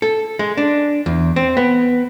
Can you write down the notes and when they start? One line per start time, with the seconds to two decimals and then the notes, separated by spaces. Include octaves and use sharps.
0.02 A4
0.39 G#3
0.57 D4
1.06 E2
1.36 C4
1.57 B3